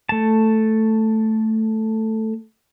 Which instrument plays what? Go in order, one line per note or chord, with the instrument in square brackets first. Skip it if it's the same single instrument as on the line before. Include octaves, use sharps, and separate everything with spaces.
[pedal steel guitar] A3 A5